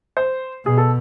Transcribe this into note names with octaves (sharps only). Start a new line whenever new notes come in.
C5
B2 G#4
A4